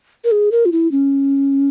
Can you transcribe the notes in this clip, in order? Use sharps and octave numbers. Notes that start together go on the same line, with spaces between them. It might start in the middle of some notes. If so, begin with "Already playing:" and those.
A#4
G#4
A#4
F4
E4
C#4